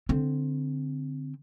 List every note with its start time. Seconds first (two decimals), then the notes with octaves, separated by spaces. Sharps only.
0.09 D3 C4